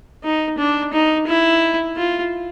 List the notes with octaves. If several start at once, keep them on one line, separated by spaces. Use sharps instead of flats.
D#4
D4
D#4
E4
F4